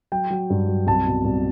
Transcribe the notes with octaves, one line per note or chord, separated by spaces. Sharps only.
F#3 G5
F#3
G2
F#3
C2 A5
B2
C2